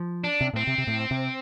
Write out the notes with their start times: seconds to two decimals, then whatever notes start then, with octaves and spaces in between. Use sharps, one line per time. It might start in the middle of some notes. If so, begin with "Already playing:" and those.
Already playing: F3
0.24 D4
0.41 C3
0.53 A2 C4
0.67 C3
0.78 C3
0.87 A2
1.11 C3